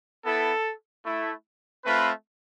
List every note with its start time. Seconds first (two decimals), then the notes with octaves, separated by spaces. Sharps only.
0.25 B3 E4 A4
1.04 A3 E4
1.84 A3 C4 F4 B4